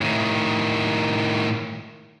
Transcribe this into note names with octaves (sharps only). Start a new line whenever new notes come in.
A2 D#3